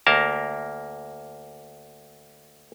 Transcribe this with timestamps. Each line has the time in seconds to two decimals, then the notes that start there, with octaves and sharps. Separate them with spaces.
0.06 D2 A#3 A#4 A5